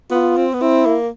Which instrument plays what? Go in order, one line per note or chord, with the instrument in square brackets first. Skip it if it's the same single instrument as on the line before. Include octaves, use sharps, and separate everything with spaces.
[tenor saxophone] B3 [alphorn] F4
[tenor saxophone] C4
B3
[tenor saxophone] C4 [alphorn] E4
[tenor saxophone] A#3